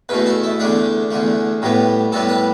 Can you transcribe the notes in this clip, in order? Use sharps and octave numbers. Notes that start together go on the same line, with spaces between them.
E2 B2 A3 B4
A4
E4
E2 D3 A3 D4
E2 D3 A3
A2 G3 B3
A2 G3 B3 A4
B4